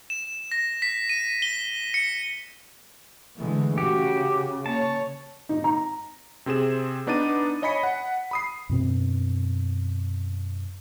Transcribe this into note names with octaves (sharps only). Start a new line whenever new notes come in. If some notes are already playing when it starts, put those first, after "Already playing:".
E7
A#6
B6
D#7
G7
C#7
D3 E3 G#3 A3
C#3 F#4 G4
A#3 C#5 A5
D#4
A#5
C3 C4 G#4 E7
B3 D4 D#4 D6 A6 D#7
C#5 D#5 G#5 B5 B6 C#7
F#5
B5 D#6 C7
F#2 B2 C4